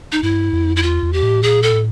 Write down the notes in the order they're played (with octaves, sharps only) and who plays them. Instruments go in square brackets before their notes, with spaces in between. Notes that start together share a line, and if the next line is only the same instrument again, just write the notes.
[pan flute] D#4
[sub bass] G2 [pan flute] E4
[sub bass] F2
[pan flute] E4
[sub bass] E2 [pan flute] F4
[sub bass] E2
[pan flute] G4
[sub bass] A2
[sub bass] A#2 [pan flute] G#4
[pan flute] A4
[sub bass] A2